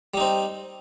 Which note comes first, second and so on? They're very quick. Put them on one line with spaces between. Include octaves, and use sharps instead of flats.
G3 D#4 C4